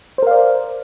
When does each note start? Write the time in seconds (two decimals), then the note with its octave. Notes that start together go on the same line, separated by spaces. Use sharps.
0.18 C5
0.23 A#4
0.27 F5
0.31 D5